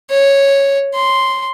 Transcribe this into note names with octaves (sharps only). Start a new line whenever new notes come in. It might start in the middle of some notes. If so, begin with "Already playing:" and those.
C#5
C6